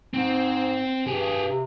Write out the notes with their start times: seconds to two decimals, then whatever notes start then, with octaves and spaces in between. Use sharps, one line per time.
0.14 G#2 C4
1.07 G2 G4 G#4
1.48 C3